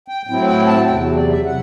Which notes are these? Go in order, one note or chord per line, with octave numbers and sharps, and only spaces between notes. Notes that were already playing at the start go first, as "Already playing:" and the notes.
G5
A2 F#3 C4 E4 G5
G5
A5
E2 C3 F#3 G5
D5
E5
C3 F#3 F#5